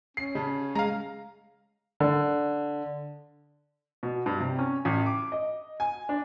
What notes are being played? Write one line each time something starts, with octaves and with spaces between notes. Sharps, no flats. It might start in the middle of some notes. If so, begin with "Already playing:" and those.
C#4 C7
C#3 A5
G#3 F5 A#5
D3
B2
G2
C3
C#4
A1
D6
D#5
G#5
D4